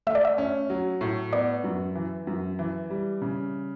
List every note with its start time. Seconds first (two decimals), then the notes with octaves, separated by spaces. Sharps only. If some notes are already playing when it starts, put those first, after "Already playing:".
0.07 A3 E5
0.15 D5
0.25 E5
0.38 C#4
0.70 F#3
1.01 A2
1.33 B3 D5
1.64 F#2
1.95 E3
2.27 F#2
2.59 E3
2.90 G3
3.22 C#3